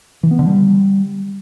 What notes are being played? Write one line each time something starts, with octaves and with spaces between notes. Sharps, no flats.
E3
B3
D3
G3